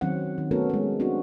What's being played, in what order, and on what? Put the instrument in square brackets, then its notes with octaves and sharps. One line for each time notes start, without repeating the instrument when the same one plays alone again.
[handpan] D#3 F#3 C4 C#4 F#5
D#3
A3 B3 C#4 F#4 A4 A#4
G#3 C#4
C4 D4 F#4